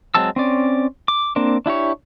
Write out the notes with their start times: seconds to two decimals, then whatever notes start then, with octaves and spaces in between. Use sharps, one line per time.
0.15 F#3 G#3 C4 A5 E6
0.36 C4 C#4 D5
1.08 D6
1.36 A#3 C4 D4
1.66 D4 E4 G4 C#5